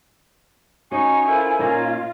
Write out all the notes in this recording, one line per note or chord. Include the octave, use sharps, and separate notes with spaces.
C#4 D#4 F#4 G#5 C#6
E4 F4 A4 A#4 C5
A#2 A#3 C#4 D#4 F4 C#5 D#5